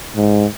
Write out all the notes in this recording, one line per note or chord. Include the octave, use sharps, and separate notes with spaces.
G#2